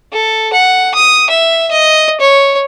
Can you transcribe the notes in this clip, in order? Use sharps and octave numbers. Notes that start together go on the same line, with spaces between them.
A4
F#5
D#6
E5
D#5
C#5